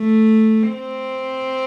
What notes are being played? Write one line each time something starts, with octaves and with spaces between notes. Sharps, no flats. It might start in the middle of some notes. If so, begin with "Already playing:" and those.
Already playing: A3
C4